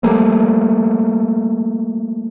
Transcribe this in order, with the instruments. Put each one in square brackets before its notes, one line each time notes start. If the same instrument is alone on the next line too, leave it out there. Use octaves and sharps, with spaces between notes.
[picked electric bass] F3 G3 A3 A#3